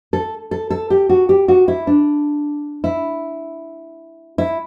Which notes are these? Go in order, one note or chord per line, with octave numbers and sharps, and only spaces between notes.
A4
A4
A4
G4
F#4
G4
F#4
E4
D4
E4
E4